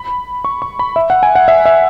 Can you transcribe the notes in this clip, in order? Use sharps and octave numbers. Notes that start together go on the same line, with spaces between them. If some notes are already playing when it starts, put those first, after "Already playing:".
Already playing: B5
C#6
C#6
B5
E5
F#5
G#5
F#5
E5
E5